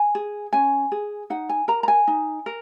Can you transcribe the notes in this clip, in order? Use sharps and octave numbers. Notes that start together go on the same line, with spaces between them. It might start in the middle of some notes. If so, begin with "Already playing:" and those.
Already playing: G#5
G#4
C#4 G#5
G#4
D#4 F#5
G#5
A#4 A#5
A#5
G#5
D#4
A#4